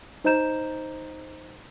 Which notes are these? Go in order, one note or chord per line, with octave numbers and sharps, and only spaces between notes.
D#4 C5 D#5 A#5 G6 E7